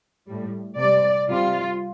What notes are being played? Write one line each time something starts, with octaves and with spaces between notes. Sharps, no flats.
A2 G3
C3 G3 D5
C3 G3 F4